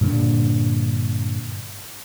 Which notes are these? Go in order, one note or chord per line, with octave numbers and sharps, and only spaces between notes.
G2 A#2 D3